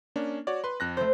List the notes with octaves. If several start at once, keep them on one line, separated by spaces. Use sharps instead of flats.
A#3 C#4 D4
F#4 C#5 D5
B4 C6
F2 F#6 A#6
A3 C5